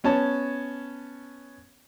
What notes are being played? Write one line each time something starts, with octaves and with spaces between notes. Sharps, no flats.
B3 C#4 C#5 A5